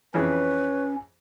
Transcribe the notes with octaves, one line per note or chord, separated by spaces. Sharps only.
F2 E3 C#4 G#4 B4 C#5